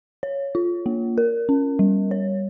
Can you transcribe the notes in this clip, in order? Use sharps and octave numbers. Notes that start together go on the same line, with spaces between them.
C#5
F4
A#3
A#4
C#4
G3
C#5